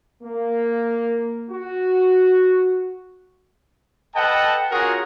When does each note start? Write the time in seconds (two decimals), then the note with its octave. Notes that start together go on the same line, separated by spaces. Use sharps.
0.23 A#3
1.51 F#4
4.15 A4 B4 D#5 F#5 G5 A5
4.70 C#4 F4 F#4 G#4 A#4 F#5